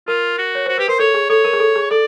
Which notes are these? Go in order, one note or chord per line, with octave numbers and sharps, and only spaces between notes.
F4 A#4
F#4
C#5
F#4 C5
G4 B4
A#4 C5
A4 C#5
G#4
A4 C#5
A#4
G#4
A4
G#4
A4 D5